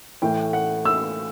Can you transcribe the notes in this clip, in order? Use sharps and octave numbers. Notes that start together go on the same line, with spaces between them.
A2 E3 A3 G5
F#5
E6